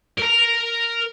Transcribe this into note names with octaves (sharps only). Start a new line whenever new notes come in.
A#4 A#5